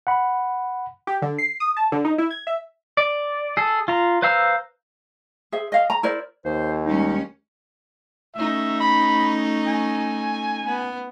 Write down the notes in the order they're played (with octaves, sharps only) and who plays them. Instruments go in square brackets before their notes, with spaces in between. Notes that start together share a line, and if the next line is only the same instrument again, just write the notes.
[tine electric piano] F#5 B5
[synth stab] G4
D3
C7
D#6
A5
D3
D#4
E4
G#6
E5
[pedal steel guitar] D5
G#4 A4
F4 A#5
B4 C5 F5 A#5 E6
[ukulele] G#4 C5 E5
D#5 F5
A#5
E4 A#4 C5 D5
[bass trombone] D#2 [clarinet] C5
[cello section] G3 G#3 C#4 [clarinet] D#4
[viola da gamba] A3 C#4 D#4 [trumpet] E5
[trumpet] B5
G#5
[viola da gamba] B3